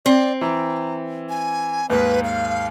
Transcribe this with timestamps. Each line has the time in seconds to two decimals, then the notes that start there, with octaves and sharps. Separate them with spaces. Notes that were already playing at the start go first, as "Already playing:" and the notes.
0.06 C4 D5
0.41 E3 A#5
1.29 G#5
1.90 D#2 G#2 A#3 B4
2.24 F5